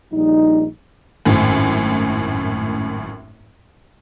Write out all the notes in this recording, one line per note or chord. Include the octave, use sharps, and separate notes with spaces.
A#1 G3 D#4
G#1 F#2 A2